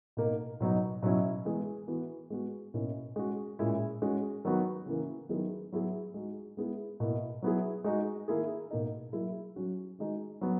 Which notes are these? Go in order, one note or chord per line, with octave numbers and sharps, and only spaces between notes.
B2 A#3 D#4
B2 F#3 B3 D#4
B2 F#3 C#4 E4
E3 G#3 B3
E3 B3 F#4
G#3 B3 F#4
B2 A#3 C#4 E4
G#3 C#4 F#4
A#2 G#3 C#4 E4
G#3 C#4 F#4
D#3 F#3 B3 F#4
C#3 E3 A#3
D#3 F#3 B3 E4 G#4
F#3 B3 E4 G#4
G#3 D#4 F#4
G#3 B3 E4 G#4
B2 A#3 E4
F#3 B3 E4 G#4
G#3 D#4 F#4
D#3 A#3 E4 G#4
B2 A#3 D#4
F#3 A#3 E4 G#4
F#3 C#4 F#4
D#3 G#3 D#4 F#4
F#3 B3